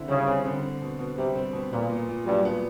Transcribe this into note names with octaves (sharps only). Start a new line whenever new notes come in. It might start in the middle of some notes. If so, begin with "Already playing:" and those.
Already playing: D3 C4 E4
C#3 G3
C4
D3
C4
B2
B2
C3 G3
C4
B2
A#2 B3
A#2
A#2
G2 F#3
B3